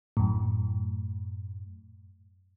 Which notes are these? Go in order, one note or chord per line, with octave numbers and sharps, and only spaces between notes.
F#2 A2